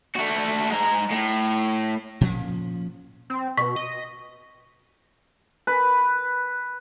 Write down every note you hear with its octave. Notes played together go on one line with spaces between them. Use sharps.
A3 F#4
G#3 A#5
A2
A#2 F3 C#4
C4
B2 C#6 B6
D#5
B4